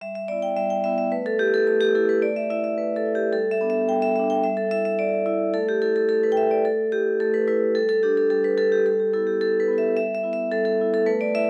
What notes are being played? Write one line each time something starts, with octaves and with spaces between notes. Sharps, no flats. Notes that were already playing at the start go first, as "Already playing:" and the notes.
G3 E5
E5
B3 E4 D5
G5
G3 E5
G5
B3 E4 E5
E5
A3 B4
A4
E4 G4
A4
A3 A4
G4
E4 A4
B4
A3 D5
E5
E4 E5
E5
A3 B4
A4
E4
G4
G3 A4
E5
B3 D4
E5
G3 G5
E5
B3 D4 E5
G5
G3 E5
A4
E4 E5
E5
G3 D5
E4
A3 A4
G4
E4 A4
A4
A3 A4
B4
G5
E4 E5
D5
A3 A4
E4 G4
A3 A4
B4
E4 B4
G3 A4
A4
D4 G4
A4
G3 A4
B4
D4 A4
G4
G3 A4
G4
B3 E4 A4
G4
G3 A4
B4
B3 E4
E5
G3 E5
E5
B3 E4
E5
G3 A4
A4
B3 E4
A4
A3 B4
D5
E4 E5